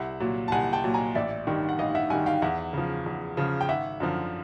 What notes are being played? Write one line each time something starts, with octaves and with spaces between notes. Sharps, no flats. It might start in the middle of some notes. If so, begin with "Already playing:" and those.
Already playing: C2 E5 F#5
A#2 F#3
A5
C2 F#5 G#5
G5 A5
A#2 F#3
G#5 A#5
A1 D5 E5
G2 D#3
F#5
A1 D#5 F5
E5 F#5
G2 D#3 F#5 G#5
F5 G5
E2 E5 F#5
C#3 F3
E2
C#3 F3
G5
G#1 E5 F#5
F#2 D3 F3